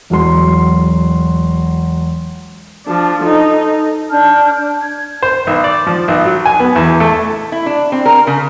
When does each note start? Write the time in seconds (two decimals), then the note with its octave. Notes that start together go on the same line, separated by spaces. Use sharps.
0.10 E1 F#3 C6
2.86 F3 D4
3.22 D#4 A4
4.10 D4 A5 F6 G6
4.57 D4
4.80 G#6
5.22 C5
5.47 B1
5.64 D5
5.87 F3
6.08 B1
6.25 F#3
6.46 G#5
6.60 B3
6.76 E2
7.00 A3
7.52 E4
7.66 D4
7.92 C4
8.06 A#4
8.27 C#3